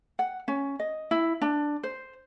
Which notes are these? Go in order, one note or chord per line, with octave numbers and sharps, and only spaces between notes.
F#5
C#4
D#5
E4
D4
C5